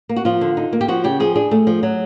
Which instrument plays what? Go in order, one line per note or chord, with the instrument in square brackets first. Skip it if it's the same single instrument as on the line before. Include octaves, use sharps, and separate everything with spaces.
[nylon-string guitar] A#3
F#4
F3 F4
D3
D#4
A#3
G4
F3 F#4
C#3 G4
F3 G#4
D4 G#4
A3
F3
F#3